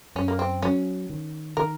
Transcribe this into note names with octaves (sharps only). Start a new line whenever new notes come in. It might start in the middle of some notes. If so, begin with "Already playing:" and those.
F#2 C#4
A#3
C4
F#3 C#4
D#3
D#3 A#4